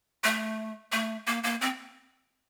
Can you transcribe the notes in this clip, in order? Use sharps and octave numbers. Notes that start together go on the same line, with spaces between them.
A3
A3
A#3
A#3
C4